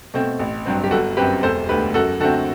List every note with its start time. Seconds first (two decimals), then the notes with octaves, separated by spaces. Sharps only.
0.14 B2 A3 C4
0.39 A1
0.65 G2 F#3 C4
0.84 G4
0.91 G1 F#4 A4
1.17 F#2 F#3 C4 G4 B4
1.43 E1 A4 C5
1.69 D2 D3 G4 B4
1.94 F#2 F#4 A4
2.20 D3 A3 C4 F#4 A4